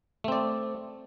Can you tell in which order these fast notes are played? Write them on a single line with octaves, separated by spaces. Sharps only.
A3 C4 D5